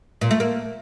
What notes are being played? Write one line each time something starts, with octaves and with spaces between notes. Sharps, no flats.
A#2
A3
A#3